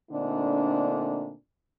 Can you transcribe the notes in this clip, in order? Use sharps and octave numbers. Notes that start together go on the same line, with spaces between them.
A#2 D3 A3 C4 D4 D#4